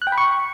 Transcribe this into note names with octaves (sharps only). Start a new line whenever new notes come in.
F#6
G5
B5
C#6